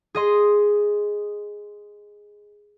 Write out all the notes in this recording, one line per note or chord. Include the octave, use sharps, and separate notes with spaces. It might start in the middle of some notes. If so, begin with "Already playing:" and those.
G#4 D#5 C6